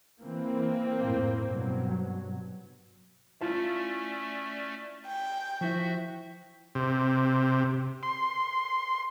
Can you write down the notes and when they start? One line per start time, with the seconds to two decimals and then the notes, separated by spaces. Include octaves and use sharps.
0.21 E3 A#3 C4
0.99 F2 A2
1.43 G2 B2 F#3
3.41 A3 C#4 E4 F4 D5 A5
5.07 G5
5.61 F3 E4 F#4 E5 G6
6.75 C3
8.03 C6